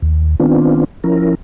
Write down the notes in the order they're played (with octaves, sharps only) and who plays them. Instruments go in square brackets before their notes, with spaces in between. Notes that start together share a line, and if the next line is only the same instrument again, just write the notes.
[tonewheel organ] D#2
D#3 B3 C4 D4 F4
F3 C#4 E4 A#4